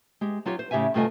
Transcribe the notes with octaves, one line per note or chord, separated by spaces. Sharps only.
G#3 G4
F#3 F4 G4 C#5
C5
A2 C#3 G4 C#5 E5 G#5
G2 C3 A3 F4 D#5 G#5